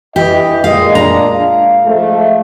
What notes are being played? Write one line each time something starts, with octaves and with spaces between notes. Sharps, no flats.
E3 G4 D#5
A#2 G#3 D#5 F5
D4 A#5
F5
G#2 F3 A3